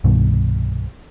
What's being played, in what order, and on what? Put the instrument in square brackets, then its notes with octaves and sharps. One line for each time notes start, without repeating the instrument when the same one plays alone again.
[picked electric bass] C2 G2 B2 D#3